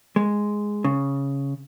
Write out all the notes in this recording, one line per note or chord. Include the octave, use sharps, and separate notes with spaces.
G#3
C#3